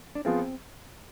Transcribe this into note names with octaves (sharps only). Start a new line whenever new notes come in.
D4
F3 B3 C4 F4 G#4